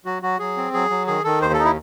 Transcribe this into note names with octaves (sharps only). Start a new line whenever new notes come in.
F#3 F#4
F#3 F#4
F#3 G#4
C4
F#3 G#4
F#3
D#3 G#4
D#3 A4
D#2 C5
A4
D#4
E4